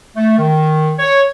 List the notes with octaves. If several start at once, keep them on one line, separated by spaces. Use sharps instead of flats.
A3
D#3
C#5